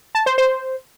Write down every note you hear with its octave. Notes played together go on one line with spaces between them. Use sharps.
A5
C5
C5